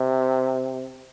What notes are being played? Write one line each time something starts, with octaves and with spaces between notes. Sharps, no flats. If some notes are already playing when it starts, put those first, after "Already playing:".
Already playing: C3